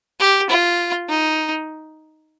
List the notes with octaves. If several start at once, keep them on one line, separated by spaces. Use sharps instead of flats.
G4
F4
D#4